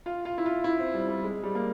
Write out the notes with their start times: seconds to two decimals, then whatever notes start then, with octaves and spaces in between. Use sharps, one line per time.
0.06 F4
0.25 F4
0.38 E4
0.46 F4
0.64 E4
0.79 C4
0.94 G3
1.08 G3
1.24 G#3
1.43 G3
1.55 A#3